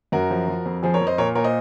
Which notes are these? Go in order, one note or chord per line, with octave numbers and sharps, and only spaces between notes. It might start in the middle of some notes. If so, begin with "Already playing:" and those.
F#2 F#4 A#4
F3
F3
F2
F3 G#4 C5
A#4 C#5
F2
C5 D#5
A#2 A#4 C#5
A#2 A#4 C#5
C5 D#5